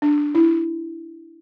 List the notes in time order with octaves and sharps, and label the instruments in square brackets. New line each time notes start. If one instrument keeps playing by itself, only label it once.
[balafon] D4
E4